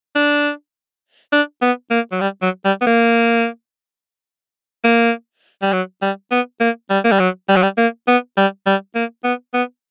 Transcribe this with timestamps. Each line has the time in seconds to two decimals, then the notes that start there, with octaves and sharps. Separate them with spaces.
0.16 D4
1.33 D4
1.62 B3
1.91 A#3
2.12 F#3
2.21 G3
2.42 F#3
2.65 G3
2.81 B3
2.87 A#3
4.84 A#3
5.62 G3
5.73 F#3
6.02 G3
6.31 B3
6.61 A#3
6.90 G3
7.04 A#3
7.11 G3
7.20 F#3
7.49 G3
7.56 F#3
7.63 G3
7.78 A#3
8.08 B3
8.37 G3
8.66 G3
8.95 A#3
9.24 B3
9.54 B3